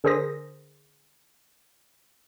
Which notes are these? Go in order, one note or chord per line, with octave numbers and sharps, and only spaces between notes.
D3 G#4 A#4 C5 D#6 A#6